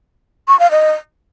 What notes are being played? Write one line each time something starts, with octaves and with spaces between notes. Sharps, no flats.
C#6
F5
D#5